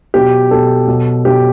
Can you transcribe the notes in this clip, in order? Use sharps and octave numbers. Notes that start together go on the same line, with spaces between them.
B2 F#3 G4
B2 F#3 A4
B2 F#3
B2 F#3 G4